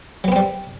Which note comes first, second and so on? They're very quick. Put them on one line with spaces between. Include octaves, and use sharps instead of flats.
F#3 B3 C4 G3